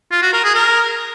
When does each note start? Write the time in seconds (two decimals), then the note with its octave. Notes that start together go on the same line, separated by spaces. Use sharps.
0.11 F4
0.22 F#4
0.33 A#4
0.44 G#4
0.55 A#4